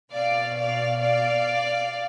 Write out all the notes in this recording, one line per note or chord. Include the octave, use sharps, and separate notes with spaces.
B2 D5 F5
D5 F5
D5 F5